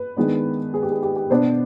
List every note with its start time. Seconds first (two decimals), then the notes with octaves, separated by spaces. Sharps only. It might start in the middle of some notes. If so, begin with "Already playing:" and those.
Already playing: B4
0.17 D#3 G#3 B3 D4
0.74 G#4
0.82 G4
0.92 G#4
1.03 G4
1.16 G4
1.30 B2 B3 D4 C5